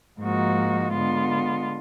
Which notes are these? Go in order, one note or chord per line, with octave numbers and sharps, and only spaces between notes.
G#2 F3 A#3 D#4 F#4
D3 G#3 B3 F4